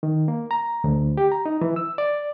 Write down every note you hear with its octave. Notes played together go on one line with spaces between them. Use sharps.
D#3
A#3
A#5
D2
G4
A#5
D#4
E3
E6
D5